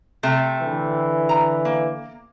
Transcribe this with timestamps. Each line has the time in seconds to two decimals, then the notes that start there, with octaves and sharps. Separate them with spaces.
0.23 C3 A3
0.62 D3 E3
1.29 A#5
1.65 A#3